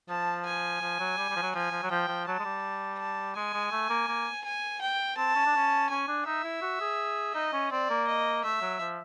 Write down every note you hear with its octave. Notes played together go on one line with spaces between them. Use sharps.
F3 A5
G#5
F3
F#3
G3
G3
F3
F#3
F3 G#5
F3
F#3
F3 G5
F3
F#3 A5
G#3
G3
A5
G#3 G#5
G#3
A3
A#3
A#3
G#5
G5
C4 A5
C#4
D4
C#4
C#4 G#5
D4
D#4 E5
E4
F#4
G#4
D#4 D#5
C#4
C4 D5
A#3
D#5
A3 E5
F#3
F3